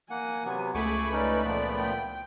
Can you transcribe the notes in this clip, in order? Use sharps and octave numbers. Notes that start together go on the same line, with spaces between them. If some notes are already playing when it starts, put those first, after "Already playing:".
A#3 F#5 G#5
C3 F#3 B3
C#2 A3 G#4 G#5 B5 C#6 D6
C#4 D#4 B4 D5
A#2 F3 B3 D5
G5